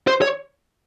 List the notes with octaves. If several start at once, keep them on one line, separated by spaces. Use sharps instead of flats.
C5
C#5